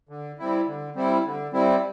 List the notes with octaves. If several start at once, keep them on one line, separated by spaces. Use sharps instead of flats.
D3
G3 C4 E4
D3
G3 C4 E4
D3
G3 C4 E4